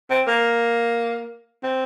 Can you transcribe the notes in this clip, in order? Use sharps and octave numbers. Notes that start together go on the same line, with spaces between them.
C4
A#3
C4